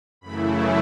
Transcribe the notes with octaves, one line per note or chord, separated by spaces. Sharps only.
F#2 C#3 E3 A3 E4 B5